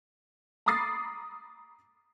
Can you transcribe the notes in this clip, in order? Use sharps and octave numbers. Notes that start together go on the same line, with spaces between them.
A#5 B5 D6 D#6 A6 C7